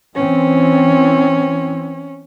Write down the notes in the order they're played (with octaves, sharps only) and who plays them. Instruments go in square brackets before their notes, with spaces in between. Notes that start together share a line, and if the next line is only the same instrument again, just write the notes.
[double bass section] E3 C4 [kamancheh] C#4